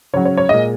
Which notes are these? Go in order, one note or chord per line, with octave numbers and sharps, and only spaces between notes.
C#3 F#3 C#5
C#5
C#5
A#2 G#3 D#5